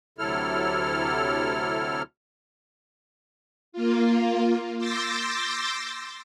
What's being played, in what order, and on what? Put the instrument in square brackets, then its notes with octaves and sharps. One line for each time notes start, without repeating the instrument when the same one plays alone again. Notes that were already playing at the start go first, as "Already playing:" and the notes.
[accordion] D2 C3 F#3 E4 A4 F6
[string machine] A#3 F4
C6 D6 E6 G6 A6 A#6